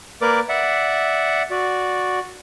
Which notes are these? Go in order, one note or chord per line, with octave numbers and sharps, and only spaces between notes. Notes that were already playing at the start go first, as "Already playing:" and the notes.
A#3 A#4 B4 D5 D6
D5 E5 F#5
F#4 D5